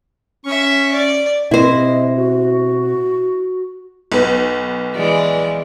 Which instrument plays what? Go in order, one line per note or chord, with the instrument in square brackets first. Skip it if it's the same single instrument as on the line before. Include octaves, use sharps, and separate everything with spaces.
[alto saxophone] C#4 [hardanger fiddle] E5 C#6
[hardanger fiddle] D5
[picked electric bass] B2 C4 [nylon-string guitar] E4 C5 [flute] D#5
[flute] F#4
[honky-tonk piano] B1 B3
[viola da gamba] E3 G#3 D5